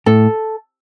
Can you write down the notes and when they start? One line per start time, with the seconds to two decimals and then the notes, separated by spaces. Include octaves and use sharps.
0.06 A2 A4